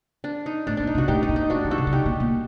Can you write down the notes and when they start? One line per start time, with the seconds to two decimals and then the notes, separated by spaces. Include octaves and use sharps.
0.24 D4
0.46 D#4
0.67 A2 D4
0.77 A#2 D4
0.87 D#4
0.95 C3
0.98 D4 F#4
1.08 A2 D#4 G4
1.23 D#4
1.29 A#2
1.36 D#4
1.50 D4 F#4
1.65 D#3
1.71 F#4 A4
1.78 C3
1.87 D3
1.92 C3 D#4 G4
2.06 A#2
2.20 A#2